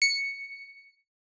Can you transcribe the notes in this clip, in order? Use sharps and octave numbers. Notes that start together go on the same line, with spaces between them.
C#7